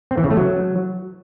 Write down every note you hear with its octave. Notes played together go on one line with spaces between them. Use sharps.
C4
E3
C#3
A3
F#3